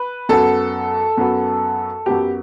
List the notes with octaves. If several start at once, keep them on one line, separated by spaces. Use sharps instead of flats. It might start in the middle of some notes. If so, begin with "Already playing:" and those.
Already playing: B4
F#2 F#3 B3 A4
F#2 F#3 B3
F#2 F#3 B3 G4